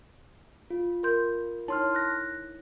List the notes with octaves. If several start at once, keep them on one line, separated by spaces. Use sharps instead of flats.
F4
A#4 C6 G6
D#4 E4 C#5 A5 C6 F6
F#6 A#6